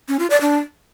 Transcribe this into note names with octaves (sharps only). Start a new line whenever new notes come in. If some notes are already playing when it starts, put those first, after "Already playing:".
C#4
F4
D5
D4